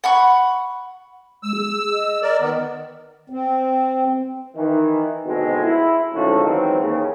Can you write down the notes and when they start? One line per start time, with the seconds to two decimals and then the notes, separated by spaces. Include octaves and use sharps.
0.04 F#5 B5 C#6
1.43 G#3 E6
1.56 G#4
1.93 D#5
2.22 A#4 D5
2.41 D#3 B3
3.30 C4
4.56 D#3 E3
5.26 G#1 D2 B2 G#3 C4 A4
5.62 E4
6.14 D2 G#2 C#3 F3 F#4 A4
6.43 D#3 E3 F#3 G#3 C4
6.80 D#2 C#3